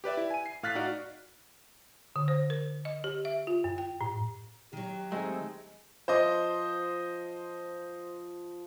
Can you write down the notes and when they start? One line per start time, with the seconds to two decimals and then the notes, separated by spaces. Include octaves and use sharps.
0.04 G4 B4 D5 E5
0.17 E4
0.31 G#5 D#7
0.46 C7
0.63 A2 F5 F6 F#6 A6 B6
0.75 D#4 F#4 D5
2.16 D3
2.28 C5
2.50 A#4
2.85 D#5
3.04 G4
3.25 E5
3.47 F4
3.64 F#2
3.78 G5
4.01 A2
4.73 D#3 F#3 G4
5.12 G#3 A3 C4 D#4
6.08 F3 C5 D#5